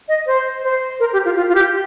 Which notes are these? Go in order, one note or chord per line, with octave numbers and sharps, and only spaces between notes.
D#5
C5
C5
A#4
G4
F4
F4
F4
G4